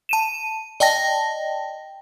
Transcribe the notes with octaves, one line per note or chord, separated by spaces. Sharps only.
A5 D#7 E7
D5 D#5 G5 A5 A#6